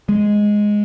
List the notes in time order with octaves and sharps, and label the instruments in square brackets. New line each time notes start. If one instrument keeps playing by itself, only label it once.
[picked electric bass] G#3